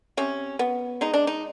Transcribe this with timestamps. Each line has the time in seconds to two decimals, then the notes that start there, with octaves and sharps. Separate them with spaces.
0.17 C3 C#4
0.59 B3
1.01 G#3 D#4
1.14 D4
1.27 D#4